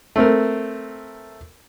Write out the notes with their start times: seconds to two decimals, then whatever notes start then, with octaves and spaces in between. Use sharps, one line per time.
0.16 A3 C4 A#4